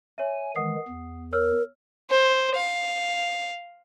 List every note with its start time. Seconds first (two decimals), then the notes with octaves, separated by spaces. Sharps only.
0.18 C#5 E5 G#5
0.56 D#3 E3 G#3 F#5 D#6 C7
0.88 E2
1.33 A#4 C#5 E6 F6
2.10 C5
2.55 F5